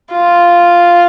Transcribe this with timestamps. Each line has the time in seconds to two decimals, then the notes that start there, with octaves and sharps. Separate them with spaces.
0.12 F4